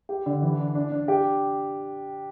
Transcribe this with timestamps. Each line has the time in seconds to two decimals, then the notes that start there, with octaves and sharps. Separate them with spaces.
0.09 G4
0.26 D3
0.42 E3
0.59 D4
0.75 D4
0.92 D4
1.08 G4